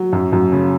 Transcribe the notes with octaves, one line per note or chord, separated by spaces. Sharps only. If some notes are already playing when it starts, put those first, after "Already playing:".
Already playing: F#3
F#2
F#2
C#3